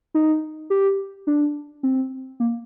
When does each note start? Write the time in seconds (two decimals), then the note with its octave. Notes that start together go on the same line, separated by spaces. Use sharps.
0.14 D#4
0.70 G4
1.27 D4
1.83 C4
2.40 A#3